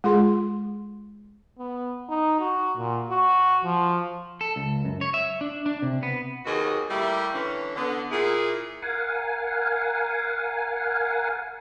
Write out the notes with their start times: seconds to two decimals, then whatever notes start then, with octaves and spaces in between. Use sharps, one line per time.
0.04 G#3 F4 G#4 C6
1.59 B3
2.10 D#4
2.40 F#4
2.76 A#2
3.10 F#4
3.64 F3
4.41 A4
4.56 C#2
4.85 F#2
5.01 C#5
5.14 E5
5.41 D4
5.66 D4
5.82 C3
6.03 B3
6.45 D#2 B2 F#4 G#4 D#5
6.90 G3 A3 A#3 E4 G4
7.34 D3 E3 C#4
7.76 D3 B3
8.10 A#2 E4 G#4
8.82 A#4 F5 F#5 G#5